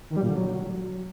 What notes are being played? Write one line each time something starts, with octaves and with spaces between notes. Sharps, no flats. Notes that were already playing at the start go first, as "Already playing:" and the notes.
D#3
G3
A#2
D3
F#3